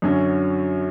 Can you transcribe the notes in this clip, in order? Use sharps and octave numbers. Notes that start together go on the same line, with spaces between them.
F#2 D3 F#3 C#4